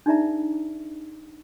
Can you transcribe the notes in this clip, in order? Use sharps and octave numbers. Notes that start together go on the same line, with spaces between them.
D4 D#4 G#4 D5 E5 A#5